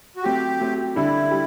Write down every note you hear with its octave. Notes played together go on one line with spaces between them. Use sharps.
F#4
F#3 A3 C4 G4
F#3 A3 C4
D3 G3 D4 E4 A4
G3